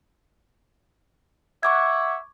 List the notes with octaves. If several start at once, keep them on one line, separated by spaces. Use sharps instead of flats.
E5 F#5 C#6 D6 G#6